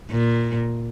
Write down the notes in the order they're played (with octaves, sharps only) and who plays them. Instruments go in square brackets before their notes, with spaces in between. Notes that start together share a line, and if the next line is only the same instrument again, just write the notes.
[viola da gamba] A#2